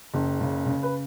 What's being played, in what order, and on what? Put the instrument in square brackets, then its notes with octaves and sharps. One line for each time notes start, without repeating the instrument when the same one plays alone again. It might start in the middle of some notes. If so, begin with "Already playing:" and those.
[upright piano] F#1
C#3
C#3
B4